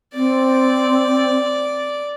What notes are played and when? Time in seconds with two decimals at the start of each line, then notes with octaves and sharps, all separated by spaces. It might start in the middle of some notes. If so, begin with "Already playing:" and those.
0.14 C4 D5